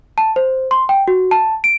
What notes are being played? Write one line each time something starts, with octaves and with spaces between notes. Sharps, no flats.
A5
C5
C6
G5
F#4
A5
D7